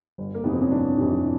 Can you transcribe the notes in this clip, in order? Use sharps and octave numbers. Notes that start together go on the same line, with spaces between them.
G1
A#3
F2 C3 E3 B3
C4
C#4
G1 D4
F2 C3 E3